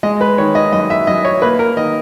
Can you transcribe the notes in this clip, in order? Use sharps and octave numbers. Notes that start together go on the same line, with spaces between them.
G#3 D#5
B4
D#3 C#5
D#5
F#2 D#5
E5
F#2 D#5
C#5
A#3 B4
A#4
D#3 D#5